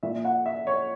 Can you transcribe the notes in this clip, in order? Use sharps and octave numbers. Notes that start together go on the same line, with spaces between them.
A#2 E5
F#5
E5
C#5